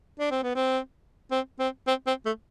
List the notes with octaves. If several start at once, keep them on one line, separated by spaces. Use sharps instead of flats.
D4
C4
B3
C4
C4
C4
C4
C4
A3